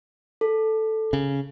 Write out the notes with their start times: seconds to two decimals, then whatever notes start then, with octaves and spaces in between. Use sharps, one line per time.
0.41 A4
1.13 C#3